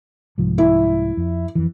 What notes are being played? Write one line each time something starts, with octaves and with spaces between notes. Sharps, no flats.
C2 G#2 F3
E4
F2
F2 E3